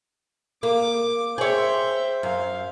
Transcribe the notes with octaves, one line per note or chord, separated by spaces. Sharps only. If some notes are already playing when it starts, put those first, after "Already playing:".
A#3 D6
G#4 C5 C#5 E5 G5
F#2 F5